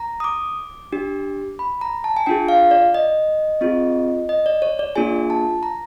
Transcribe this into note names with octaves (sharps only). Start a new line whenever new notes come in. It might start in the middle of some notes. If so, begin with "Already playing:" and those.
Already playing: A#5
D#6
D6
D4 G4
B5
A#5
A5
G#5
D4 F4 G#4 G5
F5
D5
D#5
C4 F4 G#4
D#5
D5
C#5
D5
A#3 D4 F4 G#4 G#5
A5
A#5